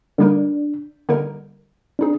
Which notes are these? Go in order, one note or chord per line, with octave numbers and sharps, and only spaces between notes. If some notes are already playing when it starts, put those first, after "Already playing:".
D3 G3 A#3 D4 D#4 A#4
D3 G3 A#3 D#4 A#4
C4 D4 D#4 G#4